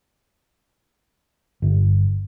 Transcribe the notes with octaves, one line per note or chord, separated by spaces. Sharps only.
G1